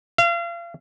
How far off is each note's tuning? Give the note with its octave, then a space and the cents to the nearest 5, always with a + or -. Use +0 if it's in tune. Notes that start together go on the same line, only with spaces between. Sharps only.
F5 -35